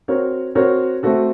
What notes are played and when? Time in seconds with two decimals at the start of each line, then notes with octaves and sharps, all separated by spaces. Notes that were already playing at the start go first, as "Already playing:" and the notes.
0.08 C4 F#4 A#4 C#5
0.55 C4 F#4 A#4 C#5
1.03 A3 C4 F#4 A4